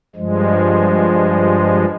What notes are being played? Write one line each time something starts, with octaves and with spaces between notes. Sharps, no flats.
G2 F3 G#3